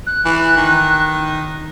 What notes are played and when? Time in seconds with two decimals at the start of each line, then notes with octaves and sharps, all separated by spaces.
0.07 F#6
0.25 E3
0.57 D#3